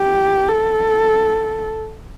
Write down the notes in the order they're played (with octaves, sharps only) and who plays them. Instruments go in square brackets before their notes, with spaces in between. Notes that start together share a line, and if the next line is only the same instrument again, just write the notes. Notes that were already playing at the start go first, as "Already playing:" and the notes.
Already playing: [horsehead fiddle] G4
A4